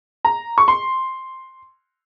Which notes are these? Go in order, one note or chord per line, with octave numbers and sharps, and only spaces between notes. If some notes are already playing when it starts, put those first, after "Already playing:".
A#5
C#6
C6